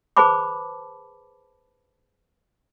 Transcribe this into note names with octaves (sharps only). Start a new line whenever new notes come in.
G#4 B4 C5 A5 B5 D6